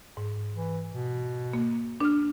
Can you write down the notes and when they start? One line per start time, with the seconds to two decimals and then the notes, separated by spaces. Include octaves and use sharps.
0.17 G#2
0.54 E3
0.93 B2
1.53 A#3
2.00 D4 F6